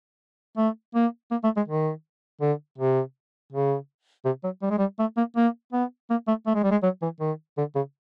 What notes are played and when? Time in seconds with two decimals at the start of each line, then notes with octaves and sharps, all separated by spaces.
0.57 A3
0.95 A#3
1.31 A#3
1.44 A3
1.56 G#3
1.68 D#3
2.41 D3
2.78 C3
3.52 C#3
4.25 C3
4.43 F#3
4.62 G3
4.70 G#3
4.78 G3
4.99 A3
5.17 A#3
5.36 A#3
5.73 B3
6.10 A#3
6.27 A3
6.46 A3
6.55 G#3
6.63 G3
6.71 G#3
6.83 F#3
7.02 E3
7.20 D#3
7.57 D3
7.75 C#3